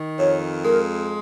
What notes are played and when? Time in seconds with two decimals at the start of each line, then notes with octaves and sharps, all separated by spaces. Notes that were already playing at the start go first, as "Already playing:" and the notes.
Already playing: D#3
0.18 F2 C#5
0.63 G#3 A#4